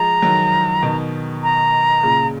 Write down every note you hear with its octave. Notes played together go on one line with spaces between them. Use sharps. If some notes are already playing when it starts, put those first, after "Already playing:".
Already playing: F3 G#3 A#5
D#3 F#3
B2 D#3
A#5
A#2 C#3